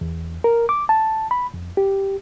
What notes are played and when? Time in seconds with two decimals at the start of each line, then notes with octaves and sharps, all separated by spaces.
0.01 E2
0.44 A#4
0.69 D6
0.89 A5
1.31 B5
1.54 F2
1.77 G4